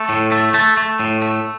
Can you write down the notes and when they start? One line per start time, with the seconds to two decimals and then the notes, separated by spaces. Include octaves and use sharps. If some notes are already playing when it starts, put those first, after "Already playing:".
Already playing: A3
0.09 A2
0.32 A3
0.54 A3
0.77 A3
1.00 A2
1.22 A3